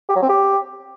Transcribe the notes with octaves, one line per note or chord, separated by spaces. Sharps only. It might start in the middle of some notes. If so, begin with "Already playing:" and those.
G4
F#3
C4
G4